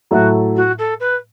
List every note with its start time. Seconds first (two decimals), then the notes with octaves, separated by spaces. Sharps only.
0.11 A2 F#3 A3 E4 F#4 A4
0.56 F#4
0.78 A4
1.00 B4